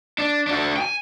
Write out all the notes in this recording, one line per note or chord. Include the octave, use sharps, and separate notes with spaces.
D4
D4 F#4
G5 G#5